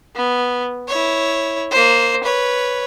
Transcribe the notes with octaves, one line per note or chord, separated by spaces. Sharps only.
B3
E4 C#5
A#3 C5
B4 C#5